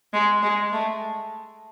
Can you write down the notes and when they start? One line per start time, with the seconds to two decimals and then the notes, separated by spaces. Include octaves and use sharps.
0.13 G#3
0.43 G#3
0.72 A3